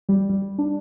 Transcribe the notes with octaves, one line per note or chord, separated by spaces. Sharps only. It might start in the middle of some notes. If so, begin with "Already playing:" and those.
G3
G3
D4